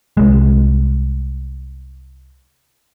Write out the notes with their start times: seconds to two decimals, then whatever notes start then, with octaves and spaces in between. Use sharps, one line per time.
0.17 C2 G#3